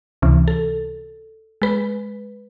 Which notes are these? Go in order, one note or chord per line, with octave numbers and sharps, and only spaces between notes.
C#2 C3 E3
A4
G#3 B4